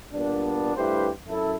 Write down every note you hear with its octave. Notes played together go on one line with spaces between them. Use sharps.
A#2 G3 B3 D4
G2 A3 E4 G4 B4 C5
F#2 E4 A4